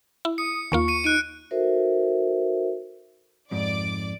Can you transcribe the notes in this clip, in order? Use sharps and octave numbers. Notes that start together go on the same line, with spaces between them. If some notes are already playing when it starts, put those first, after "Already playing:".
E4
D#6 C#7
D#2 A#3 F4 C#6
C#7 D#7
D#4 F#6 D7 D#7
D#4 F#4 A4 A#4 C5 E5
F2 G#2 D5 D6